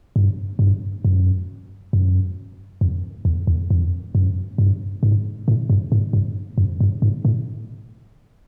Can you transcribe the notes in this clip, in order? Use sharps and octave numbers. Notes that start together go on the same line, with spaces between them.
G2
G2
F#2
F#2
F2
E2
E2
F2
F#2
G2
G#2
A2
G2
G#2
G2
F#2
G2
G#2
A2